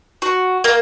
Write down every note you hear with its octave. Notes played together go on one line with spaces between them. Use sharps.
F#4
A#3